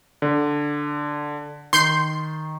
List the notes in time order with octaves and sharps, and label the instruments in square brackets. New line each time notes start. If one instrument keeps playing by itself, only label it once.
[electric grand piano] D3
[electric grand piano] D#3 [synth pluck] C6 G6 C7